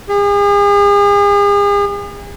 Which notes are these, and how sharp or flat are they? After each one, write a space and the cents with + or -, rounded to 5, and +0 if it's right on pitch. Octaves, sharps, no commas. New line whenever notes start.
G#4 -40